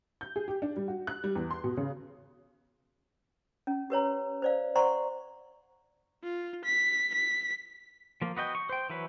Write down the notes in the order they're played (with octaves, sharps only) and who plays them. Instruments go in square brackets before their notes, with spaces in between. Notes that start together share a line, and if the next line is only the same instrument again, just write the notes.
[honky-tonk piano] G6
G#4
G4
D4
G3
F#4
F#6
G3
E2
C6
B2
C#3
[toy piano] C#4
G4 B4 C#5 A#5
C5 D5 F5
C5 D5 F#5 A#5 C6 C#6
[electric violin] F4
B6
B6
[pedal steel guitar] F3 A#3
B3 F#4 D#5 G5
C#6
C5 G5
E3 F#3 B4 C#5